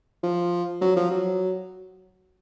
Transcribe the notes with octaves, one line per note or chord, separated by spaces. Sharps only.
F3
F#3
F3
F#3